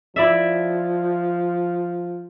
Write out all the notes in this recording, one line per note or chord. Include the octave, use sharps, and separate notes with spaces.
F3 E4 D5 E5